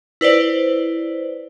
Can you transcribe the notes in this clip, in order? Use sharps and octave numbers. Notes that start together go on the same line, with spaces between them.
E4 B4 C5 D5